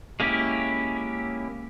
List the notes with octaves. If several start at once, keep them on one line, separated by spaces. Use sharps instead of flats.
G#3 A#3 C#4 E4 G4